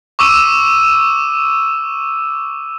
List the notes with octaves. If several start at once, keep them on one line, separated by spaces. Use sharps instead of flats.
C#6 D6 E6 D#7